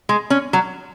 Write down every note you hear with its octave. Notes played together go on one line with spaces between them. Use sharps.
G#3
C#4
F#3